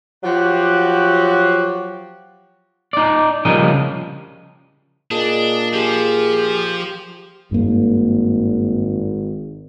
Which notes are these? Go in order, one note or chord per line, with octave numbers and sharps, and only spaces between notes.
F3 F#3 F#4 G4
D#4 D5
C#3 F3 G3 A#4 D#5
A#2 D4 G#4 D#5
F3 G4 G#4
G#1 G2 A#3